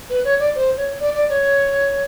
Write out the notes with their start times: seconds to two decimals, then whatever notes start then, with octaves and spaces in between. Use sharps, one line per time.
0.10 B4
0.24 C#5
0.39 D5
0.55 C5
0.77 C#5
1.00 D5
1.14 D5
1.29 C#5